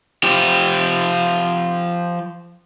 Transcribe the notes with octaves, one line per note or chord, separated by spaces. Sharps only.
F3 G4